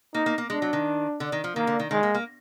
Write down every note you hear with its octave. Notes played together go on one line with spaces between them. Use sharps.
A#3 D#4
A#3
A#3
G#3 D4
F#3
D#3
D3
D#3
F3
D#3 A#3
D3
D#3
D#3 G#3
A#3
A#3